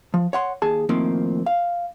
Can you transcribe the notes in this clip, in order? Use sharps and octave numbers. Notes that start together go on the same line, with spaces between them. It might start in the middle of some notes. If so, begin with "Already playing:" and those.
F3
C#5 F#5 C6
D#2 G#4 A5
A2 D#3 F3 A#3 C4
F5